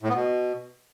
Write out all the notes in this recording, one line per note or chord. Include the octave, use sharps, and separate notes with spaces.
A2
B3
B2